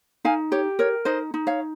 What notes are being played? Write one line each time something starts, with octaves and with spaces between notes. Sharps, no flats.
D#4 F5 G#5
G4 C#5
A#4 C#5
D#4 C5 D#5
D#4
C#5 F5